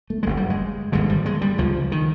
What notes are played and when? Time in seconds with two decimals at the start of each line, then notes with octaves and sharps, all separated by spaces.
0.10 A3
0.23 G#3
0.26 G1 F#2 C#3
0.37 G3
0.50 G#3
0.92 G#1 G2 D3 G#3
1.10 G3
1.26 G#3
1.41 G3
1.58 C#2 C#3 F3
1.92 D#3